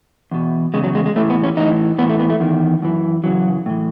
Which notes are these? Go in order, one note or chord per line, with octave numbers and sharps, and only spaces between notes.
E2 B2
E2 C#3 G#3
F#3
G#3
G#3
A2 E3 A3
B3
C#4
A2 E3 D#4
A2 E3 B3
A3
B3
A3
E2 D#3
F#2 E3
F#2 C#3 E3 F#3
A2 E3